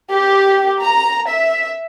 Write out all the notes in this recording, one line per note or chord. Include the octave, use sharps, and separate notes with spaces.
G4
A#5
E5